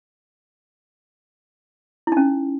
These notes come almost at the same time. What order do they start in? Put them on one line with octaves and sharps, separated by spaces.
E4 D#4 C#4